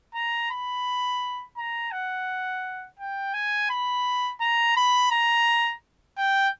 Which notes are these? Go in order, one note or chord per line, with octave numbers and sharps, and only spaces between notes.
A#5
B5
A#5
F#5
G5
G#5
B5
A#5
B5
A#5
G5